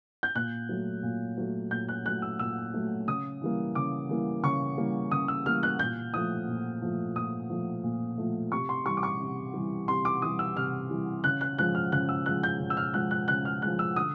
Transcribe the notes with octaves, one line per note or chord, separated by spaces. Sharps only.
G6
A#2 F#6
F#3 A3
A#2
F#3 A3
A#2 G6
F#6
F#3 A3 F#6
E6
A#2 E6
F#3 A3
C#3 D#6
E3 G3 A#3
C#3 D6
E3 G3 A#3
C#3 C#6
E3 G3 A#3
C#3 D#6
E6
E3 G3 A#3 F6
F#6
A#2 G6
F3 A3 D#6
A#2
F3 A3
A#2 D#6
F3 A3
A#2
F3 A3
C3 C#6
C6
E3 G3 C#6
D6
C#6
C3
E3 G3
C3 C6
D6
E3 G3 D#6
E6
C3 F6
E3 G3
C#3 F#6
F#6
F3 G#3 F#6
F6
C#3 F#6
E6
F3 G#3 F#6
G6
C#3
E6
F6
F3 G#3 F#6
F#6
C#3 F#6
F6
F3 G#3 F#6
E6
D3 D#6